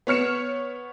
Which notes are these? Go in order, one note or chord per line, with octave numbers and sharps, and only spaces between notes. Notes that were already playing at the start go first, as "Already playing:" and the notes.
B3 C#5 F6 C#7 E7